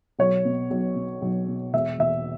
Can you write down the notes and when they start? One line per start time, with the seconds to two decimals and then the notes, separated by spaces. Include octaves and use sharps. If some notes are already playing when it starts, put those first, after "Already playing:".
0.19 B1 C#5
0.45 B2
0.70 B1
0.96 B2
1.22 B1
1.48 B2
1.73 E1 E5
1.99 E1 E5